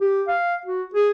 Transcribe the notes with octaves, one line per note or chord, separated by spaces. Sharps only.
G4
F5
F#4
G#4